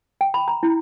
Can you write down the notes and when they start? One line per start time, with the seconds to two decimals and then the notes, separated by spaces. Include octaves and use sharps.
0.21 G5
0.34 B5
0.48 A#5
0.63 E4